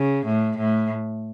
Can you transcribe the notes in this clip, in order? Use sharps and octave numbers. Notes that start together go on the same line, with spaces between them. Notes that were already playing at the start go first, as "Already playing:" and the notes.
Already playing: C#3
A2
A2